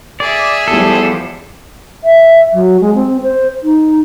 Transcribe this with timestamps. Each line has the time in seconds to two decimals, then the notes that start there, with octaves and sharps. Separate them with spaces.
0.20 G#4 D5 E5
0.68 E2 F3 G3 G4 A4
2.04 E5
2.53 F#3
2.81 G#3
2.95 C4
3.23 C5
3.63 D#4